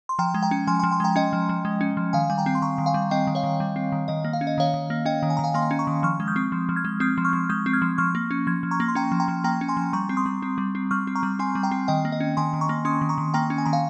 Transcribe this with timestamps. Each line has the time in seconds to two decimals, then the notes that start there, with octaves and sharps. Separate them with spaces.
0.09 C6
0.19 F3 G5 A#5
0.34 G#3
0.43 G5 A#5
0.51 C#4
0.67 F3 G#5 C6
0.79 F3 G#5 C6
0.92 G#5 C6
1.00 G#3 G5 A#5
1.16 C#4 D#5 G5
1.33 F3
1.49 F3
1.65 G#3
1.81 C#4
1.97 F3
2.13 D#3 F5 G#5
2.30 G3 G#5
2.38 G5 A#5
2.46 C4
2.55 C6
2.62 D#3 A#5 C#6
2.78 D#3
2.86 F5 G#5
2.94 G3
3.11 C4 D#5 G5
3.27 D#3
3.35 C#5 F5
3.43 D#3
3.60 G3
3.76 C4
3.92 D#3
4.08 D#3 D#5
4.24 A#3
4.33 F5
4.41 C#4
4.47 D#5
4.58 D#3 C#5 F5
4.74 D#3
4.90 A#3
5.05 C#4 D#5 G5
5.23 D#3
5.30 G#5
5.37 D#3 A#5
5.44 F5 G#5
5.54 A#3 G#5 C6
5.71 C#4
5.79 A#5 C#6
5.87 D#3
6.03 F3 C#6 F6
6.20 G#3
6.27 D#6 G6
6.36 C4
6.52 F3
6.69 F3
6.76 F6 G#6
6.85 G#3
7.00 C4 D#6 G6
7.18 F3
7.25 C#6 F6
7.33 F3
7.49 G#3 D#6 G6
7.66 C4
7.73 F6 G#6
7.82 F3
7.98 F3 C#6 F6
8.15 A#3
8.31 C#4
8.47 F3 F6 G#6
8.63 F3
8.71 A#5 C#6
8.80 A#3
8.88 C6
8.95 C#4 G5 A#5
9.12 F3
9.20 G5 A#5
9.28 F3
9.44 A#3 G5 A#5
9.61 C#4
9.68 G#5 C6
9.77 F3
9.93 G3 A#5 C#6
10.09 C4
10.17 C6 D#6
10.26 G3
10.42 C4
10.58 G3
10.75 C4
10.91 G3 C#6 F6
11.07 C4
11.15 A#5 C#6
11.23 G3
11.39 C4 G#5 C6
11.55 G3
11.63 G5 A#5
11.71 C4
11.88 D#3 D#5 G5
12.05 A#3
12.12 D#5
12.20 C#4
12.37 D#3 G#5 C6
12.53 D#3
12.61 A#5 C#6
12.69 A#3
12.85 C#4 C6 D#6
13.01 D#3
13.09 A#5 C#6
13.18 D#3
13.34 A#3 G5 A#5
13.50 C#4
13.58 G#5
13.65 D#3 A#5
13.73 F5 G#5